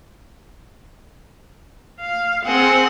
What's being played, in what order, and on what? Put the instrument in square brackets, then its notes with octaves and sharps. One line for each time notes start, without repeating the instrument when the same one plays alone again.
[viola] F5
[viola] C4 [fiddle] G#4 F#5